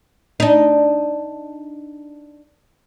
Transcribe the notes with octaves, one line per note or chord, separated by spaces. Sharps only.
D4 D#4